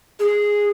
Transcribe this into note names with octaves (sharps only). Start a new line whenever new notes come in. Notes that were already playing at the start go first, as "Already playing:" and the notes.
G#4